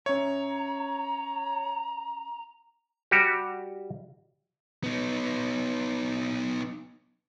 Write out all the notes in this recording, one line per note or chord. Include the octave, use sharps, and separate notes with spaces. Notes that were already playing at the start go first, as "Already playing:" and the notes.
C#4 C#5 E5 A#5
G3 F#4 G4
B3 D#4